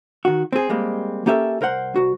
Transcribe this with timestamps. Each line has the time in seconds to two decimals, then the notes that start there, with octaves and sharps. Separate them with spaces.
0.25 D#3 F#4
0.53 C4 G#4
0.69 G3 G#3 A#3 C4
1.26 A#3 C#4 G4 A4 D5 E5
1.61 C2 A#4 C5 F#5
1.96 C2 F#4